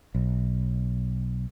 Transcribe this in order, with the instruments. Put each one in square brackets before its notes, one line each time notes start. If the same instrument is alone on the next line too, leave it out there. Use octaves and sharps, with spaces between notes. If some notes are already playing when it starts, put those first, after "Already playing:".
[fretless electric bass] B1